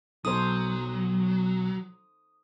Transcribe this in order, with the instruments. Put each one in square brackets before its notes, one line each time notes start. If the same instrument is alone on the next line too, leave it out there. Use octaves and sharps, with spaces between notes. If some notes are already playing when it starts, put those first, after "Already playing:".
[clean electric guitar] B1 [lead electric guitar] F#3 [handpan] D#4 A4 C5 [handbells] D#6